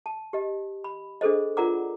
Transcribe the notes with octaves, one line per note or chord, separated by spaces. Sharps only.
A5
G4 D#5
B5
D4 G#4 A4 C5 D#5
F4 A#4 D5 F#5 A#5 D6